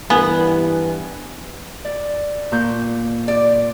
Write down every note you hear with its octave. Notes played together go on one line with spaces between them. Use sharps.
G2 E3 B3 G#5
D5
A#2 C#6 G6
D5